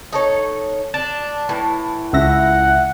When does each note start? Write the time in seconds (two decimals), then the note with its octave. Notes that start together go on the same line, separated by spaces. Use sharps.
0.13 D#4 A4 C#5
0.94 D4 A5
1.49 A2 E3
2.13 C#2 E5 F#5 A#6